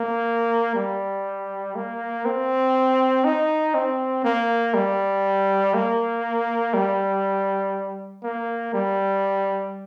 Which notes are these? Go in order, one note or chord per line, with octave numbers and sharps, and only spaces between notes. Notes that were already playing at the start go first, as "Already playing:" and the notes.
Already playing: A#3
G3
A#3
C4
D#4
C4
A#3
G3
A#3
G3
A#3
G3